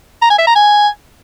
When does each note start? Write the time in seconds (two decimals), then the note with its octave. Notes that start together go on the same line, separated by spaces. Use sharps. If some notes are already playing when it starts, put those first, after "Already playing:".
0.22 A#5
0.30 G#5
0.39 E5
0.47 A#5
0.55 G#5